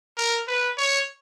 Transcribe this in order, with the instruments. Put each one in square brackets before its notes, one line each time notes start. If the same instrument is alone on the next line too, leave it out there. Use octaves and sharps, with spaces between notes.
[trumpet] A#4
B4
C#5